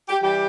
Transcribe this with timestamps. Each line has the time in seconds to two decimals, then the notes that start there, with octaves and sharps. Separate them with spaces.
0.09 G4
0.22 E3 G3 G4